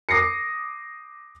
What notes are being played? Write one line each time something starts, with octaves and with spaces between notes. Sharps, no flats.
D6 D#6 A#6 C7 C#7